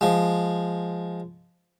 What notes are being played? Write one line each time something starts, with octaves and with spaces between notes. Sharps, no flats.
F3 G#3